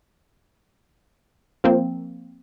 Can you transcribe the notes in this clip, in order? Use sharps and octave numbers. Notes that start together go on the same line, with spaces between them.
F3 A#3 C4